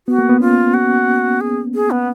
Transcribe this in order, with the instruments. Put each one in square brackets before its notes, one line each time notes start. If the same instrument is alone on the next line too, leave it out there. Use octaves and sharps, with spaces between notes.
[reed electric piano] B3 [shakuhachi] F#4
[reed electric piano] A#3
B3
[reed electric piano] C#4 [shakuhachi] F4
[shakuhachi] F#4
G#4
G#4
B3